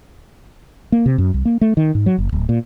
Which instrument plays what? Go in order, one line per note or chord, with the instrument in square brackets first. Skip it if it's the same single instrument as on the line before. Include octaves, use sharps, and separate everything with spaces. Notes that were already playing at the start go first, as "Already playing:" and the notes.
[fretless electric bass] A#3
C3
F#2
C2
A#3
A3
D#3
G#2
F#3
F#1
D1
A#2